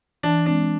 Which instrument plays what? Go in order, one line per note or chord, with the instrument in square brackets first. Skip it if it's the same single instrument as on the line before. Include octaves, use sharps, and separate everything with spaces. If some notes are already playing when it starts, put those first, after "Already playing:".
[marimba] E3 [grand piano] D4
[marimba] G#3 C4 [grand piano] D4